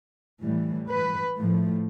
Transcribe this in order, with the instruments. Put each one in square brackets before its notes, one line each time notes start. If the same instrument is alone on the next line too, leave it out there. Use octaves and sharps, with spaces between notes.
[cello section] A2 E3 G3
B4
A2 F3 A3